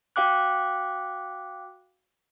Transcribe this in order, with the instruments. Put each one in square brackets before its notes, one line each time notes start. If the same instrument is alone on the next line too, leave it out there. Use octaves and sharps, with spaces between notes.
[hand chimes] F#4 F5 G5 D6 F#6